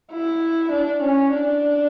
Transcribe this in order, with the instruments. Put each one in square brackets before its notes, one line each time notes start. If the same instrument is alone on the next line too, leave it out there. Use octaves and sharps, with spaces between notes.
[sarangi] E4
D4
C#4
D4